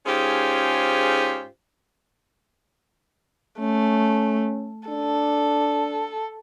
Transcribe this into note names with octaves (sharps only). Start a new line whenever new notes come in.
G#2 C#4 F4 G4 G#4 C5
A3 C#4
D4 A4